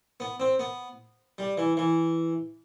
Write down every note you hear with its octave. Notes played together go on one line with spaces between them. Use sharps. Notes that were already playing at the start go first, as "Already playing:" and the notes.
B3
C4
B3
G3
E3
E3